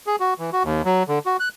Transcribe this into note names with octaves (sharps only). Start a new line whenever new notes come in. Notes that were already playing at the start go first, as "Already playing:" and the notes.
G#4
F#4
E3
F#4
D#2
F#3
D3
F#4
F#6